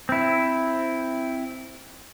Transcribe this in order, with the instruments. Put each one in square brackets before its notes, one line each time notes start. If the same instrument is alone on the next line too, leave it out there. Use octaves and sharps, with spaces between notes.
[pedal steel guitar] C4 E4